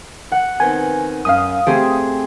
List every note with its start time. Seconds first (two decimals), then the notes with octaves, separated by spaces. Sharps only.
0.32 F#5
0.60 D#3 B3 C4 G#5
1.25 F#2 C#4 F5 D#6
1.66 A3 C4 G4 G#4 C5 G5